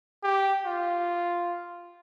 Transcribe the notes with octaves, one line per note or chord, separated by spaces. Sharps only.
G4
F4